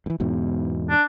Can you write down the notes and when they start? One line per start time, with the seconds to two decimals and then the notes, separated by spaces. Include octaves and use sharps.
0.06 G2 E3
0.20 E2 G#2 B2
0.90 D4